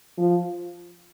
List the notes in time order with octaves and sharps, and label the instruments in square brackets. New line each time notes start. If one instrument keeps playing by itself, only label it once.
[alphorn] F3